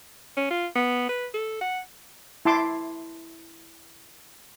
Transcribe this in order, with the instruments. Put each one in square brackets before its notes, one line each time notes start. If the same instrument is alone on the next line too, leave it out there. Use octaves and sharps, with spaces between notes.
[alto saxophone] C#4
F4
B3
B4
A4
F#5
[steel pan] E4 A5 C6 D6